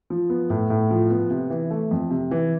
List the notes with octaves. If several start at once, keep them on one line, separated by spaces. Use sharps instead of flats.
F3
B3
A2
A2
F3
B3
C3
E3
A3
F2
C3
E3